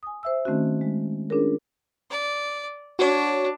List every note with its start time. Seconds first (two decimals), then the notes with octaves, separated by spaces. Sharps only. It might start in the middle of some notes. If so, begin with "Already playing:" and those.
0.03 G#5 D#6
0.23 C5 E5 E6
0.45 D#3 A3 C4 C#4 D#4 F#4
0.81 G#3
1.29 C#4 D4 F4 G#4 A#4 C#5
2.11 D5
2.99 D4 F#4 C#5